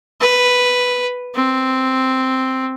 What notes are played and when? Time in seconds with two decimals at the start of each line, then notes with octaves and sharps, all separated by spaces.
0.21 B4
1.35 C4